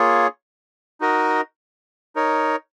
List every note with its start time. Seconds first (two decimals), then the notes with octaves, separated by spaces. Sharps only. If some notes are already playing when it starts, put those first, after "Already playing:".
Already playing: A#3 F4 G#4 C#5
1.01 D#4 F#4 A#4 D#5
2.16 D#4 A#4 C#5